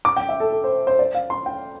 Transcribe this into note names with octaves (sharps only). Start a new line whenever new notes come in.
D6
G5
E5
A4
A4
C5
C5
D5
F5
C6
G5